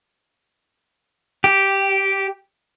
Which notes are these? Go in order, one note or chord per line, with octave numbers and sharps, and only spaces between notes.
G4